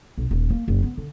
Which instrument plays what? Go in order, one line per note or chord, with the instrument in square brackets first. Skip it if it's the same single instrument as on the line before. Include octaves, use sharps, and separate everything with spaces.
[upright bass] B1
D#1
A#3
F#1
B3
D3